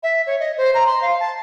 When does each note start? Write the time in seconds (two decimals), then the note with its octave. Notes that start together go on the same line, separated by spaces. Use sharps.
0.03 E5
0.27 C#5
0.40 D#5
0.57 C5
0.74 A#5
0.86 C6
1.02 F5
1.20 A5